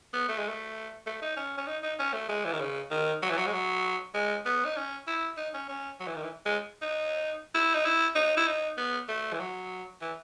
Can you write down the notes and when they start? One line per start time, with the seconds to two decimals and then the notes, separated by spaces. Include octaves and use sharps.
0.13 B3
0.28 A3
0.39 G#3
0.49 A3
1.06 A3
1.22 D#4
1.37 C#4
1.57 C#4
1.67 D#4
1.83 D#4
1.99 C#4
2.13 A3
2.29 G#3
2.45 E3
2.53 D#3
2.60 C#3
2.91 D#3
3.22 F#3
3.30 E3
3.37 F#3
3.46 G#3
3.53 F#3
4.14 G#3
4.46 B3
4.65 D#4
4.77 C#4
5.07 E4
5.38 D#4
5.54 C#4
5.69 C#4
6.00 F#3
6.07 E3
6.15 D#3
6.23 E3
6.46 G#3
6.82 D#4
7.54 E4
7.75 D#4
7.85 E4
8.15 D#4
8.37 E4
8.48 D#4
8.77 B3
9.08 A3
9.33 E3
9.40 F#3
10.02 E3